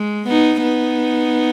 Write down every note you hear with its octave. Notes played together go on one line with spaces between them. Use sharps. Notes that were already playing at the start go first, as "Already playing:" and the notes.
Already playing: G#3
B3 D#4
B3 D#4